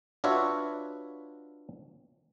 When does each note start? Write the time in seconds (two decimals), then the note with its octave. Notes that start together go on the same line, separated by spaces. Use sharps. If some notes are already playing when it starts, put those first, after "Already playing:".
0.24 D4 F4 F#4 B4 C#5 E5